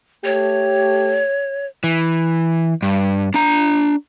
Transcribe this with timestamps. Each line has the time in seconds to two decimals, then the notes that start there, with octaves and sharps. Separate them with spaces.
0.25 A3 G4 C#5
1.84 E3
2.82 G2
3.34 D4 A#5